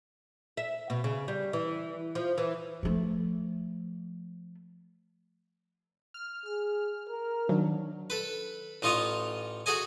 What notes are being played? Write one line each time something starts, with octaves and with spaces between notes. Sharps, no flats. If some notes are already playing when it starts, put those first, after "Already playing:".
E5
B2
C#3
G3
E3
F3
E3
F3 A3
F6
G#4 F6
A#4
D#3 F#3 D4
A4 B4
A1 D#4 F4 D#5 C#6 D#6
F#4 G#4 A4 D#5 G#5